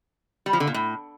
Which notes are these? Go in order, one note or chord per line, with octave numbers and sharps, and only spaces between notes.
G3
F3
D3
A#2
A2